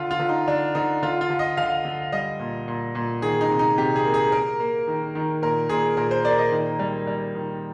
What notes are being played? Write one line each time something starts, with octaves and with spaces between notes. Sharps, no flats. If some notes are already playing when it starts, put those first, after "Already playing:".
Already playing: D3 F4
F4
D3
D#4
D3 D4
D3 D#4
D3 F4
F4
D3
D#5
D3 F5
D3
G3 D#5
A#2
A#2
A#2
D#3 G#4
D#4
C3
D#4
C3 G4
G#4
A#3
G#4
A#3 A#4
A#3
D#3
D#3
A#2 A#4
A#2 G#4
A#2 A#4
C5
A#3 D5
D#5
D#3
G3
G3
D#3